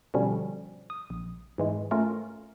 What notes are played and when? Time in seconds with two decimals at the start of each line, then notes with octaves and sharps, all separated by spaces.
0.14 B2 D3 F3 G3 C#4
0.90 D#6
1.10 A#1
1.58 G#2 E3 G#3
1.91 A3 C#4 F4 A#4